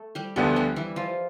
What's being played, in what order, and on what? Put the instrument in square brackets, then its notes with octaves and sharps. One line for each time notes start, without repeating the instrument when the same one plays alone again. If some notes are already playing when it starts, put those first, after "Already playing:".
Already playing: [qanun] A3 A4
G3 G4
[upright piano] D2 D3 F3 B3 [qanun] G3 G4
[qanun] G3 G4
E3 E4
F3 F4